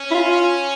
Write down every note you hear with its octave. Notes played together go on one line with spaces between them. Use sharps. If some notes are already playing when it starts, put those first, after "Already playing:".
Already playing: C#4
E4
F4